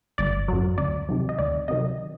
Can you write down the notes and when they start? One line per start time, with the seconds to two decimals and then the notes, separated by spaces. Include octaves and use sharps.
0.18 G1 D5
0.48 F#2 F#3
0.78 D2 D5
1.09 C3 D#3 F#3
1.29 D#5
1.38 D2 D5
1.68 C3 D#3 F#3 D#5